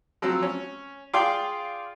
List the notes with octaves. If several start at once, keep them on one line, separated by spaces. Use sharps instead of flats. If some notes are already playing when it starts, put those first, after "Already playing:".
F3 F#3 C4 E6
C#4
F4 G#4 D5 F5 G5 C6